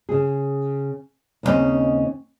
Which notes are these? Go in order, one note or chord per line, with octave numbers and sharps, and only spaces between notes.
C#3 G#4
D#2 C#3 E3 C4 C#4 D#5